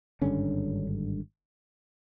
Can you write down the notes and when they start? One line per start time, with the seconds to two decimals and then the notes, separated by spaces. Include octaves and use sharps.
0.22 G#1 G2 D3 C#4